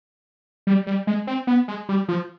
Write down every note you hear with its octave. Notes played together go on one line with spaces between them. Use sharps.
G3
G3
G#3
C4
B3
G#3
G3
F3